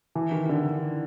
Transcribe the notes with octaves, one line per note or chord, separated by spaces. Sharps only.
E3
D#3
D3